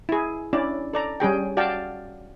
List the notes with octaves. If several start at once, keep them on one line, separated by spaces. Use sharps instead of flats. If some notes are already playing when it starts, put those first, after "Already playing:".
E4 G#4
C#4 D4 E4 D5
A4 D5 A#5
G3 C#4 G#4 G5
F#4 D5 F5 G5 A5